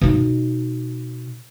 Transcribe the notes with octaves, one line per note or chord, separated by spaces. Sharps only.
B2 D#4